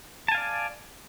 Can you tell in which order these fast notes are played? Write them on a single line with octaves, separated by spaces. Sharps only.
A5 G#5 F5 D5